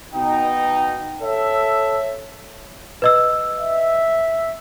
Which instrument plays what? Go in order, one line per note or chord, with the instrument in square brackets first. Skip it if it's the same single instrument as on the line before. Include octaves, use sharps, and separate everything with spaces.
[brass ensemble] B2 D#4 [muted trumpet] G5
[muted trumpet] A4 [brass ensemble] C#5 E5
[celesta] B4 D#5 E6
[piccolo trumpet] E5